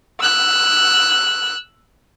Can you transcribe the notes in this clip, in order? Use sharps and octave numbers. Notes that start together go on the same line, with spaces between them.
E6 F#6